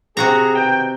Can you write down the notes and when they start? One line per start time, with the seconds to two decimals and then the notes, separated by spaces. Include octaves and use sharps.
0.17 C3 F#4 G#4 A#5
0.56 B2 D#3 G5